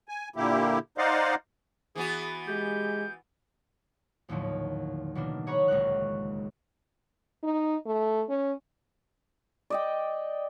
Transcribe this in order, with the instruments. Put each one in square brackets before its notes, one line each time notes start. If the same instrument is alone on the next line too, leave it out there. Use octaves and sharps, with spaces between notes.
[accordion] G#5
A#2 D3 A#3 E4 G4
D#4 C5 D5 D#5 F5 F#5
[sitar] E3 B3 F#4 [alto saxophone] G#4
[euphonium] G#3 [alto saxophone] G4 [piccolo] G6
[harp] A#1 D#2 A2 D3 F3 F#3
B2 D#3 E3 A#3 D4
G#4 C#5 F#5 A#5 B5 C#6
D#1 C#2 G#3 A#4 C#6 F#6
[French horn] D#4
A3
C#4
[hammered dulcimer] D5 D#5 G5